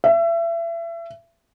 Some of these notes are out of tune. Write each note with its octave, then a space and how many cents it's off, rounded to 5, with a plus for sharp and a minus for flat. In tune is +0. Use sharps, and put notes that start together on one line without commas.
E5 +30